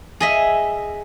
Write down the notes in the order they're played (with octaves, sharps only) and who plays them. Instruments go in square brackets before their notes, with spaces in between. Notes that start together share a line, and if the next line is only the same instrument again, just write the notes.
[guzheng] G#4 D#5 E5